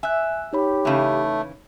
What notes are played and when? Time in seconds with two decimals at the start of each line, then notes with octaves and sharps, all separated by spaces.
0.03 E5 G#5 F#6
0.53 D#4 G4 C#5 B5
0.85 C#3 E3 A3